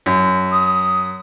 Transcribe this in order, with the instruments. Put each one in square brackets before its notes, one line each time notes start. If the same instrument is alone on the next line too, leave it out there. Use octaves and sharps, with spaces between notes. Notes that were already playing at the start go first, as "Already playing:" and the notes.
[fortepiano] F#2
[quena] D#6